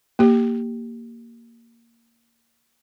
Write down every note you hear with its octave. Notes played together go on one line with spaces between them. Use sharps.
A#3 G4